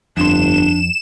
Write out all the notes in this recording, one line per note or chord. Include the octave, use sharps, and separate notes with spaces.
G1 F2 D4 C6 E7